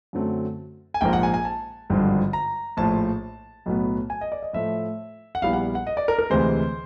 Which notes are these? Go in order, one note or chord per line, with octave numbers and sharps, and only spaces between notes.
F#2 D3 F#3 A3 C4
G#5
A#1 G#2 F3 A#3 G5
F#5
G#5
G#5
A5
G#1 G2 D3 F3
A#5
A#1 A2 F3 A5
B1 A2 F#3 B3
G#5
D#5
D5
D#5
A2 F3 A3 E5
F#5
A#1 A#2 G3 B3 E4 F5
F#5
F#5
D#5
D5
A#4
A#4
D2 C3 E3 G#3 C5